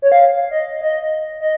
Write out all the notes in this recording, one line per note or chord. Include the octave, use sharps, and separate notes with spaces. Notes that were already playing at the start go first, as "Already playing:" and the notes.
C#5
F5
D#5
D#5
D#5